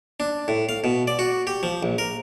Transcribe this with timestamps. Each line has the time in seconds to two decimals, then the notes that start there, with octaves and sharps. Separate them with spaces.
0.20 D4
0.48 A2
0.69 F5
0.84 B2
1.08 D5
1.19 F#4
1.47 G4
1.63 F3
1.83 A#1
1.98 A#4